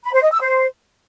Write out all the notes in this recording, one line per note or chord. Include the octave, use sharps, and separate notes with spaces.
B5
C5
D#5
E6
C5